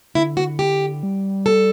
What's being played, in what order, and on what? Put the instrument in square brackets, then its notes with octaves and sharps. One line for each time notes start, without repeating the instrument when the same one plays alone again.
[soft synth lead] D3 [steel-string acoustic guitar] E4
[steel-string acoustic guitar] F#4
G4
[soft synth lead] G3
[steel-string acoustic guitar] A4